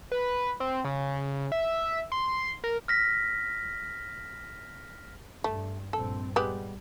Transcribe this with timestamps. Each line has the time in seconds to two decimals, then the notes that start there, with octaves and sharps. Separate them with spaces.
0.12 B4
0.60 C4
0.85 C#3
1.52 E5
2.12 C6
2.64 A#4
2.88 F6 A#6 B6
5.44 G2 A3
5.93 A#1 G2 C4 A4
6.36 G3 G#3 B3 G4